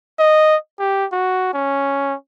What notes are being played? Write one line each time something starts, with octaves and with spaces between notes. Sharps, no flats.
D#5
G4
F#4
C#4